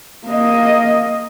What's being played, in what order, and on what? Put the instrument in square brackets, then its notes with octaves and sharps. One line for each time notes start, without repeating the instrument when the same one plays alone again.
[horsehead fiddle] A#3 D#5